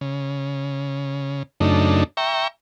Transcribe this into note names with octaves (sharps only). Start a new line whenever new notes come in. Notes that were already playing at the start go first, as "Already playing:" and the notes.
C#3
F#2 C#3 A3 D4 D#4
E5 G5 A#5 C#6